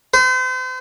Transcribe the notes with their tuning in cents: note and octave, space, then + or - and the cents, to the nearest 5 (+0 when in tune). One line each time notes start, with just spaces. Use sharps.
C5 -40